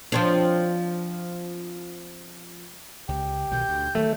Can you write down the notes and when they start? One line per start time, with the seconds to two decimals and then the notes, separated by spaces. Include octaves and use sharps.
0.12 F3 C4 D4
3.08 C#2 G4
3.51 B1 B2 D#3 G6
3.69 D2
3.95 D#3 F#3 A3